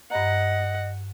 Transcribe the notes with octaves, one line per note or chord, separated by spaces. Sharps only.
G2 D#5 F#5 A#5